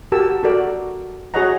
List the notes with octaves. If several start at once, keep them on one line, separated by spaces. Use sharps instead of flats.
F#4 G4 A#4 A5 E6
F#4 A4 A#4 D5
F#4 G#4 C#5 D#5 F#5 A#5